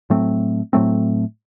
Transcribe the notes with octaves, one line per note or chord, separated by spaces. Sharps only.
A2 F#3 A3 C4
A2 F#3 A3 C4